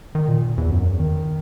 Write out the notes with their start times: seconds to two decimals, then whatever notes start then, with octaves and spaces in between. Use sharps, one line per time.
0.15 D#3
0.28 A#2
0.58 E2
0.71 F#2
0.85 E2
1.00 D#3